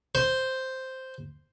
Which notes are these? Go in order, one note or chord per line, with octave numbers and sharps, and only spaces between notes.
C5